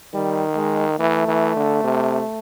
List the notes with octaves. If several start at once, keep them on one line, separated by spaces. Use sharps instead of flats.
D#3 G3
G#3
E3 A3
E3
D3
C3